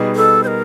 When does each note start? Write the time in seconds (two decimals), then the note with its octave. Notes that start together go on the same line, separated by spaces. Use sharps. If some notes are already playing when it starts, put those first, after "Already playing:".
Already playing: B2 G3 B3 D#4 G#4
0.16 A4
0.43 C5
0.47 A#4